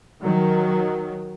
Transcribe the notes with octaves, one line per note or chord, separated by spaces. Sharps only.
D#3 F#3